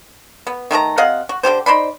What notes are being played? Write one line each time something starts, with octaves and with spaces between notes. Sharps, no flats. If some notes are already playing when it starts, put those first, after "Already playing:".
B3
D#3 A3 G4 A#5
C3 D#5 F5 F#5
F#4
D3 E4 G4 C5
D#4 C5 D5 B5